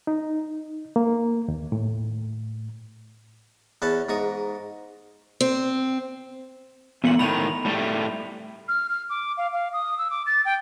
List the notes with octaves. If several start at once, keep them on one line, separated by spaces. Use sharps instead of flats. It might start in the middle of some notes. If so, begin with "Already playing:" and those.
D#4
A#3
D#2
A2
E2 B4 C#5 A5
G#2 A#5 C#6 D#6
C4
E2 A#2 B3 C#7 F#7
A2 D3 D#3 B5 F7
A2 G3 A3
F6
F6
D6
F5
F5
D#6
E6
D6
A6
G5